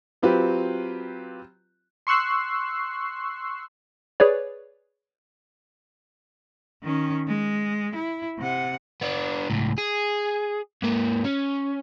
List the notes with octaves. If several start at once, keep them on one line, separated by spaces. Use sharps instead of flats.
F#3 C4 F4 G4 B4
C6 C#6 E6 F#6 C7
G#4 B4 C#5 D5
D#3 C#4
G#3
E4
C3 F#5
B3 D4
C#2 A2
G#4
G#2 A#3
C#4